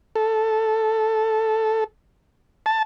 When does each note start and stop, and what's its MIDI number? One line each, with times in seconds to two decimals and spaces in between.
0.16 1.84 69
2.66 2.83 81